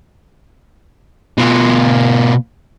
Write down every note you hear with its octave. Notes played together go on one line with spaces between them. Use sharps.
B2 F4